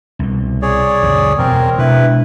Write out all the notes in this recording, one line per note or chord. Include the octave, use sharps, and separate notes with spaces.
C2 B2
G#4 C#5 D5
C#2 F#2 A#2
E1 C4 A#4
B2 G#3 D4 E4 B4